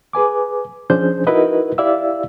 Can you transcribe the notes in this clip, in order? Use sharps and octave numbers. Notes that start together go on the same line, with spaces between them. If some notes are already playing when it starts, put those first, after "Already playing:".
G#4 B4 G#5 D6
F3 C#4 D4 G#4 C5 G6
D#4 E4 F#4 A#4 B4 D#5
E4 G4 D5 E5 F5 E6